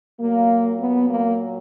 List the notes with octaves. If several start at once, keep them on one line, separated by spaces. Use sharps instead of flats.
A#2 F#3 A#3
B3
A#3